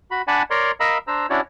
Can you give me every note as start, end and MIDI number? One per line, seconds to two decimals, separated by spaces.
0.11 0.22 66
0.11 0.22 83
0.28 0.43 62
0.28 0.43 74
0.28 0.43 78
0.28 0.43 80
0.28 0.43 81
0.28 0.43 83
0.50 0.71 70
0.50 0.71 73
0.50 0.71 74
0.50 0.71 82
0.50 0.71 84
0.80 0.98 70
0.80 0.98 75
0.80 0.98 77
0.80 0.98 82
0.80 0.98 83
0.80 0.98 88
1.07 1.26 62
1.07 1.26 72
1.07 1.26 82
1.07 1.26 88
1.30 1.41 61
1.30 1.41 62
1.30 1.41 64
1.30 1.41 66
1.30 1.41 73
1.30 1.41 74